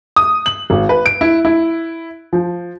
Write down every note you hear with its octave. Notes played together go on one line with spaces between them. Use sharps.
D#6
F#7
G#1
B4
D7
E4
E4
F3